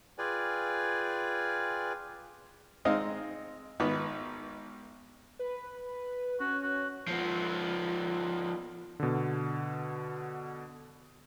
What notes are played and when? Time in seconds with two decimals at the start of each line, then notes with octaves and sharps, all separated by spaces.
0.18 F4 G#4 B4 D5 G5 G#5
2.85 G#3 C4 D#4 D#5 F5
3.80 G#1 B3
5.39 B4
6.40 C#4 F#4
6.63 F#4
7.07 F3 B3
9.00 B2 D3